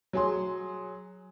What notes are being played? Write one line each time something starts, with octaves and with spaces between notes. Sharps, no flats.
F#3 G#4 C6